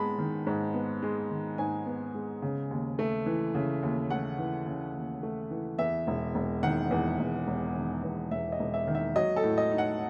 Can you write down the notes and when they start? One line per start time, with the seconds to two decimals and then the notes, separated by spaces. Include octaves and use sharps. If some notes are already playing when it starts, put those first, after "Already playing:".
Already playing: G#2 G#3 B3 A5 B5
0.18 D#3
0.47 G#2
0.74 B3
1.03 G#3
1.30 D#3
1.58 G#2 G#5
1.86 B3
2.15 G#3
2.42 C#3
2.71 D#2
2.99 A3
3.26 E3
3.55 C#3
3.83 D#2
4.10 A3 F#5
4.39 E3
4.66 C#3
4.95 D#2
5.23 A3
5.51 E3
5.78 E2 E5
6.07 E1
6.35 E1
6.63 D#3 F#5
6.91 E2
7.19 E1
7.47 E1
7.76 D#3
8.03 E2
8.31 E1 E5
8.52 D#5
8.59 E1
8.74 E5
8.87 D#3
8.95 E5
9.16 F#3 D#5
9.36 A4
9.43 A2
9.58 D#5
9.72 D#4
9.78 F#5